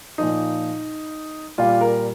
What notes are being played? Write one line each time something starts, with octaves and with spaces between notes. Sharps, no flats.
A#2 F3 D#4
A#2 G3 F4
A#4